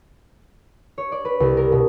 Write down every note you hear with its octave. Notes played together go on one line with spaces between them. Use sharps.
C#5
D5
B4
C2
A#4
B2